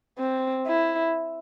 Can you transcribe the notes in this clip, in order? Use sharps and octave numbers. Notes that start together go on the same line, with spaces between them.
C4
E4